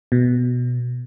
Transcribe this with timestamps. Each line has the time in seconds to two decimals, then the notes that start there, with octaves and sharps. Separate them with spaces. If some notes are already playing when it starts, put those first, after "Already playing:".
0.12 B2